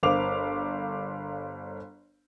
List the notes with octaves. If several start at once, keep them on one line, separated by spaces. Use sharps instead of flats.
G1 A#4 C5 F5 D6 F7